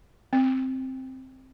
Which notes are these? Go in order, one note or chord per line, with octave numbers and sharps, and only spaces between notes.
C4